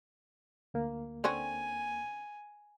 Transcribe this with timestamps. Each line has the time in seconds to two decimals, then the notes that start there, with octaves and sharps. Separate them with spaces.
0.74 D2 A#3
1.24 D3 C4 C#4 G#5